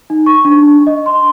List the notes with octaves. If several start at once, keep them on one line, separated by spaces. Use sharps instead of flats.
D#4
C#6
D4
D#5
C6